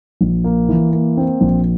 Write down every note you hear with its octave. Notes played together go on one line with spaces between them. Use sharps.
A#1
A#3
E3
A#3
C4
A#1